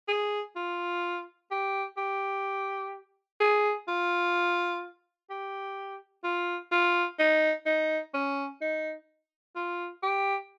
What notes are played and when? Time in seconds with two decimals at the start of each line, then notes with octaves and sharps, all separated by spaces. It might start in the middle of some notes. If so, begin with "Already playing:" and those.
0.08 G#4
0.56 F4
1.51 G4
1.97 G4
3.41 G#4
3.88 F4
5.30 G4
6.24 F4
6.72 F4
7.19 D#4
7.66 D#4
8.14 C#4
8.61 D#4
9.56 F4
10.03 G4